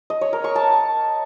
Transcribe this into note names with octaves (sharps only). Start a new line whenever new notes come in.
D#5
C#5
A#4
C#6
A5